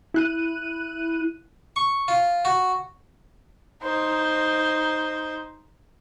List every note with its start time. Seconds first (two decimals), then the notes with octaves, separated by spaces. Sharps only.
0.14 E4 F#6 D#7
1.76 C#6
2.08 F4
2.45 F#4
3.83 D#4 C5